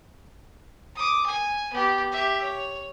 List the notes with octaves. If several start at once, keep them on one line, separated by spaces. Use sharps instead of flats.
D6 D#6
G#5
B3 G4
G4 E5
C#5